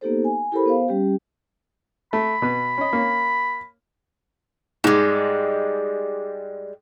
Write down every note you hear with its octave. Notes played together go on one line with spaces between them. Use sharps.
A#3 B3 D#4 G4 A4 C5
G#5
E4 G4 A4 A#4 C5 B5
B3 C5 F5
G3 C#4 G4
A3 B5
B2 B4
C#4 D#5
A#3 C#4
G#2 G3 G#3 G#4 D6